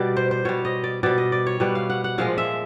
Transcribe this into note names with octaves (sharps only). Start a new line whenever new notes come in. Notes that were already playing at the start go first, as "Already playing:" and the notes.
Already playing: B2 G3 D5
C5
C5
B2 G3 C#5
D#5
D5
B2 G3 D5
D#5
D5
C#5
B2 G3 B4
F5
F#5
F#5
A#2 F3 G#3 F5
E5